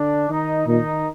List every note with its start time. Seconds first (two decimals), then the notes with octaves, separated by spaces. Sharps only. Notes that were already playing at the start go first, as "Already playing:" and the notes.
Already playing: D3 D4
0.29 D#3 D#4
0.67 A#2 D#3 D#4